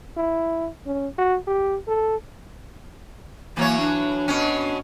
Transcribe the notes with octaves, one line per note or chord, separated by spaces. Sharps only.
E4
C#4
F#4
G4
A4
E3 F#3 A#3 C#5
D4
B2 C#4